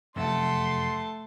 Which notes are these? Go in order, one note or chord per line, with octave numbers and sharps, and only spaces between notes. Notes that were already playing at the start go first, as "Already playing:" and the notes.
F1 F#2 A3 E5 F#5 A5 C6